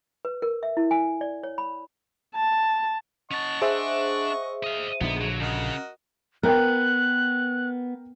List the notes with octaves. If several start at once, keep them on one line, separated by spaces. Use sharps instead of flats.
B4
A#4
E5
E4
G#5
D5
C#5
B5
A5
C#4 D#5 F#5 A5 C#6
D4 G#4 C5 E5
D#5 F5
A#1 D3 B3 D#4
F#3
C#3 F#4 A#4 D#5
B3 A#4 G5 F#6